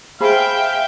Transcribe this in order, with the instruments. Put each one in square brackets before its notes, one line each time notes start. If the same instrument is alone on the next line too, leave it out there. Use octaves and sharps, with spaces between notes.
[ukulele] G#4 C5 B5 [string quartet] E5 G5 [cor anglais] F5